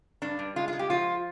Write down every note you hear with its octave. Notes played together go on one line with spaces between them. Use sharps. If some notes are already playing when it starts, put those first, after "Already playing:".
G2 D4
G2
G#3 F4
F4
G#3
G4
F3 F4